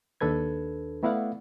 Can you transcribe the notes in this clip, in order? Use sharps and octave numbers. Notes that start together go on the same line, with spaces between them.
D#2 D4 A4 B4 G#6
A3 B3 E4 D5 F5 F#5